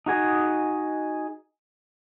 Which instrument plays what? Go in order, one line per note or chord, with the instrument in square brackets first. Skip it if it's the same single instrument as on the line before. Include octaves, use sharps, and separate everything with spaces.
[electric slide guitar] D#4 F#4 G#4 D#5